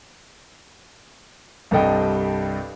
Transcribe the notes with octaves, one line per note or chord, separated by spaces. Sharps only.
C2 G2 A4 D#5 G5